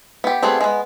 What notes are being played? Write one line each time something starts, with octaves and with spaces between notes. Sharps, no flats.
B3 G4
G3 A3 B3 C4 G#4
G#3 B3